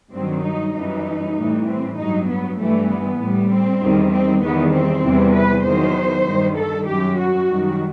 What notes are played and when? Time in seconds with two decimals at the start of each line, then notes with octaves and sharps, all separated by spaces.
0.12 G2 D#3 F#3 C4
0.43 D#4
0.74 F#2 E3 G3 D#4
1.35 A2 E3 G3
1.66 C4
1.96 G2 F#3 D#4
2.27 B3
2.58 G2 E3 G3 A3
2.89 B3
3.19 A2 G3
3.49 C4
3.81 E2 D#3 G3
4.11 C4
4.41 E2 D#3 G3 B3
4.72 C4
5.03 E2 C3 E3 G3
5.34 B4
5.64 E2 D#3 F#3 C5
6.25 G2 D#3 G3
6.56 A4
6.87 F#2 F#3 G4
7.17 F#4
7.48 F#2 D#3 G3